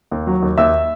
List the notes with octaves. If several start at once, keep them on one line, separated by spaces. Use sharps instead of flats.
D#2
F#3
D#2
D#2 E5 E6